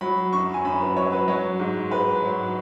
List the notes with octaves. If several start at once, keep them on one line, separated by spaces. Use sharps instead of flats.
F#3 B5
F#2 C#6
G#5
F#2 B5
B4
F#3 C#5
B4
F#3 C#5
G#2
G#2 B4
F#3